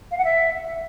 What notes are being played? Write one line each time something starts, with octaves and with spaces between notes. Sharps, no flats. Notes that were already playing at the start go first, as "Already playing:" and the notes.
F5
F#5
E5